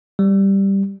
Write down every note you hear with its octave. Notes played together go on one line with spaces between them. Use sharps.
G3